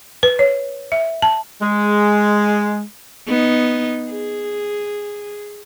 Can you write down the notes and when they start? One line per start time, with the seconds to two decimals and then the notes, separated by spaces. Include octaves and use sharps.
0.23 B4
0.39 C#5
0.92 E5
1.22 A5
1.61 G#3
3.27 B3 D#4
4.11 G#4